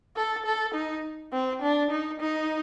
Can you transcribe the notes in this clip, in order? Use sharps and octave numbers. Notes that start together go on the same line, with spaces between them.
A4
A4
D#4
C4
D4
D#4
D#4